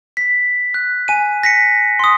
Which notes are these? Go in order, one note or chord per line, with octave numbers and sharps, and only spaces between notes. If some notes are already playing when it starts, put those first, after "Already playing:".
B6
F#6
G#5 D#7
A#6 B6 C#7
C6 D#6